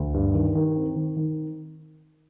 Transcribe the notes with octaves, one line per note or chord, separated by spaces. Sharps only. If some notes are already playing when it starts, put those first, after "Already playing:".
Already playing: D2
G2
D#3
D#3
C4
D#3
D#3